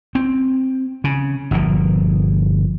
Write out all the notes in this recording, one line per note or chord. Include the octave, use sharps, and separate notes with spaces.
C4
C#3
G1 A#2 F3